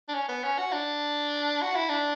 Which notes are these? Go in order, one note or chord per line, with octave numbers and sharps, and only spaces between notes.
D4
C#4
B3
C#4
F#4
D4
F#4
E4
D4